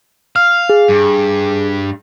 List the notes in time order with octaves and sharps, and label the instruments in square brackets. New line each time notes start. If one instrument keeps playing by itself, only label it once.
[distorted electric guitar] F5 [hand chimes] F6
[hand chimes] G#4
[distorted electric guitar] G2